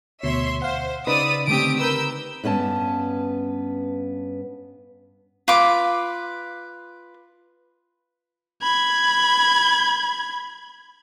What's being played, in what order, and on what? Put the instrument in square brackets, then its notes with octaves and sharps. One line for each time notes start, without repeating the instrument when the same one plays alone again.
[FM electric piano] D2 B2 C7 [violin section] C#5 E5 C6
[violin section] C5 [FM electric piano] F5 F#5
[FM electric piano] C#3 D#4 B6 [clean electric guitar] B4 [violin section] D5 D#6 E6
[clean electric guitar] D3 A3 C4 [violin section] G4 D#6 D7
[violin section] A#4 E6 G6 [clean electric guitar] B4
[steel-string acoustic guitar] G2 B3 C#4 A5
[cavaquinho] F4 B4 D6
[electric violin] B5 G#6